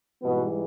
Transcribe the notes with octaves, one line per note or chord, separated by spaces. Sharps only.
G#2 B2 E3 G3 B3